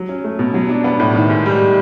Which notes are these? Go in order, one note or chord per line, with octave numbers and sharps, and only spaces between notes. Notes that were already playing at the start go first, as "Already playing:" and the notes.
Already playing: F#3
C#4
A3
B2
F#3
D4
B3
A2
D#3
G#2
G3